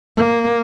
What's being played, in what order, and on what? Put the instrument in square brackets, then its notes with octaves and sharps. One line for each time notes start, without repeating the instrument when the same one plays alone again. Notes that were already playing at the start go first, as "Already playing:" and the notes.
[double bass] A#3